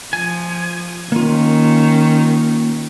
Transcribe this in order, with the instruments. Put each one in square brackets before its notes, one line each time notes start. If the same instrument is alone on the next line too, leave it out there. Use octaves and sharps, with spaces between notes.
[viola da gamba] F3 [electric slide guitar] G#5
[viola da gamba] D#3 C#4 [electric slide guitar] A#3 F4